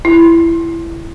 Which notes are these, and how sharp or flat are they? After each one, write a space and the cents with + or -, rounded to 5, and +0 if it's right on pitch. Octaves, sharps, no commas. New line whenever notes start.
E4 +20